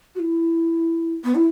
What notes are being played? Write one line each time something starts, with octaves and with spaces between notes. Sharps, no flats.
F#4
E4
B3
E4